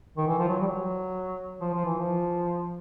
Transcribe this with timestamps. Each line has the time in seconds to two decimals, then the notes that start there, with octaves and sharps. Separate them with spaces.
0.17 D#3
0.28 E3
0.39 F3
0.48 F#3
0.61 G3
0.67 F#3
1.61 F3
1.73 F3
1.85 E3
1.98 F3